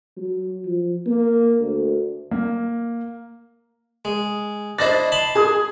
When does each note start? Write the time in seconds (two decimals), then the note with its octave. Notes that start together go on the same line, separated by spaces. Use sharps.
0.17 F#3
0.66 F3
1.06 A#3
1.61 D2
2.31 A#3
4.05 G#3
4.79 D4 E4 C5 D#5 A6
5.12 A5 B5 C6
5.35 G#4 D#6